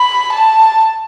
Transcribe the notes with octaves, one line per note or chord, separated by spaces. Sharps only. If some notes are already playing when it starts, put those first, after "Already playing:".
Already playing: B5
A5